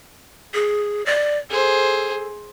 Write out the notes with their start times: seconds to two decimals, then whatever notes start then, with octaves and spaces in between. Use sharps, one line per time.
0.54 G#4
1.06 D5
1.50 G#4 A4 C5